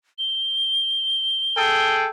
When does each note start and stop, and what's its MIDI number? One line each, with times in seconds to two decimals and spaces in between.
0.19 1.95 103
1.56 2.10 68
1.56 2.10 69
1.56 2.10 79